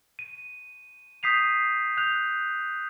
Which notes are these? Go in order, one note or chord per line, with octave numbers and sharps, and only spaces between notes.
D#7
D#6 G6 B6 C7 D#7 F7
D#6 F#6 G6 F7